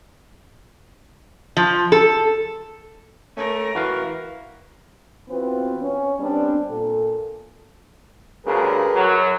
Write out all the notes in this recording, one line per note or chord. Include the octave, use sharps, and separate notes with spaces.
F3
A4
A3 C#4 A#4
E3 E4 F#4 B4 F5
E3 B3 C4 F4 F#4 B4
C#4
G3 B3 C4 D4
A#2 A4
D2 G2 C#3 G#4 A#4 B4
F#2 F#3